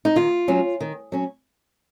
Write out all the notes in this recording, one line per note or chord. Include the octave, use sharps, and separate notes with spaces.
D#4
D#3 F4
F#3 C#4
D#3
F#3 C#4